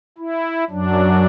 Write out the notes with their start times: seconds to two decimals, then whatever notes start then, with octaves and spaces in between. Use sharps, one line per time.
0.18 E4
0.70 F#2 F#3 D4